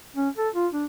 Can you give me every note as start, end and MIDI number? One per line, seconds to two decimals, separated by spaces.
0.16 0.29 61
0.37 0.49 69
0.55 0.68 65
0.73 0.86 62